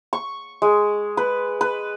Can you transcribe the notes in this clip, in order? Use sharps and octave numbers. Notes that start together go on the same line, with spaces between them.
C#6
G#3
B4
B4